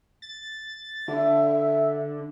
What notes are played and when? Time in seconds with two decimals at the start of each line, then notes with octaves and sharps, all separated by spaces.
0.22 A6
1.08 D3 E5